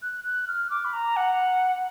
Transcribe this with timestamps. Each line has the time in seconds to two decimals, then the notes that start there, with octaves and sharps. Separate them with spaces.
0.02 F#6
0.24 F#6
0.48 F6
0.70 D6
0.85 B5
0.93 A#5
1.16 F#5